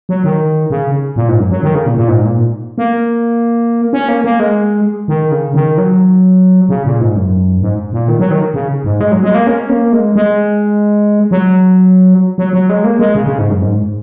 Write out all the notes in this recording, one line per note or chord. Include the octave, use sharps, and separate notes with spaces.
F#3
D#3
C#3
A#2
G#2
F#2
F#3
D#3
C#3
A#2
A#2
G#2
A#2
A#3
C#4
A#3
A#3
G#3
D#3
C#3
D#3
F#3
C#3
A#2
G#2
F#2
G#2
A#2
D#3
F#3
D#3
C#3
G#2
G#3
F#3
G#3
A#3
C#4
A#3
G#3
G#3
F#3
F#3
F#3
G#3
A#3
G#3
C#3
C#3
G#2
F#2
G#2